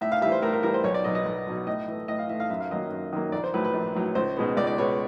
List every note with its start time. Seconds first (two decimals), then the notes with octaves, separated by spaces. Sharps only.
0.01 A2 E5
0.12 F5
0.21 G3 E5
0.26 E3
0.32 C5
0.42 A2 A#4
0.53 A#4
0.63 E3 G3 A#4
0.74 C5
0.84 B1 C#5
0.94 D5
1.04 B2 F#3 D#5
1.15 D#5
1.26 B1
1.47 B2 F#3
1.67 A2 D#5
1.88 E3 A3
2.08 A2 D#5
2.19 F5
2.29 E3 E5
2.32 A3
2.40 F5
2.50 F#2 E5
2.60 F5
2.71 D#3 F#3 A#3 D#5
2.91 F#2
3.13 D#3 F#3 A#3
3.32 A#1 D5
3.44 C5
3.54 A2 F#3 B4
3.65 B4
3.74 A#1
3.95 A2 F#3
4.15 C#2 C5
4.37 B2 G#3 B3
4.57 C#2 D5
4.67 D5
4.78 B2 G#3 B3 C#5